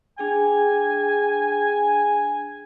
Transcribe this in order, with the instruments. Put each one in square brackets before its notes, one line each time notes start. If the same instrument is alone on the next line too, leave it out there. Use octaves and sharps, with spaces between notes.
[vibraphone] D4 G#4 G5 [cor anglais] G#5